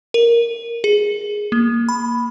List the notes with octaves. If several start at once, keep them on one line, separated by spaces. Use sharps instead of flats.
A#4
G#4
A#3
B5